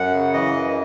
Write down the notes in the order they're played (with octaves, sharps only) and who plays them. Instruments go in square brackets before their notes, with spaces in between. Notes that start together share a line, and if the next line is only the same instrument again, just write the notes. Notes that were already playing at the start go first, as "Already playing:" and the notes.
Already playing: [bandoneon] F#2 F#5
C#3
E3 D#5
F#2